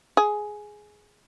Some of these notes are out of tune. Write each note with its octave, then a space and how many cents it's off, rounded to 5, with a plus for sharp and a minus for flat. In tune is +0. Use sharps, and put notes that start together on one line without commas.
G#4 +10